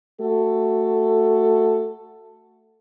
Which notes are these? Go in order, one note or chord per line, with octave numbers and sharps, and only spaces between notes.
A3 F#4 A4